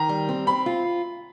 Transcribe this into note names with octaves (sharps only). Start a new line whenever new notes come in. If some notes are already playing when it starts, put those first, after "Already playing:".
Already playing: D#3 A#5
G3
C4
C4 B5
F4